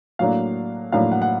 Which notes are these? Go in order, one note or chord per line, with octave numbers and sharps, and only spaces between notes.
A2 F#3 A#3 D4 F5
A2 F#3 A#3 D4 F5
F#5
F#5